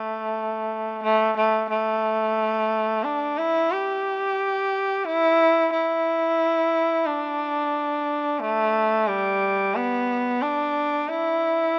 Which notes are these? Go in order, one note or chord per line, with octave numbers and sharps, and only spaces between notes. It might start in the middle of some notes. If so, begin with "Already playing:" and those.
Already playing: A3
A3
A3
A3
D4
E4
G4
E4
E4
D4
A3
G3
B3
D4
E4